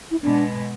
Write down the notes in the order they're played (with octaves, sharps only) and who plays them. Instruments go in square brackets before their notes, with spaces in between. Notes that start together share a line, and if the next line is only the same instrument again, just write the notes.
[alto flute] E4
[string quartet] B2 G#3 B3 [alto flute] D4